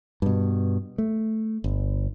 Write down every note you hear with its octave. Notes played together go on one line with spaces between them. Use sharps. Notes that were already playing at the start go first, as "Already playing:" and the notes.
G2 B2
A3
G1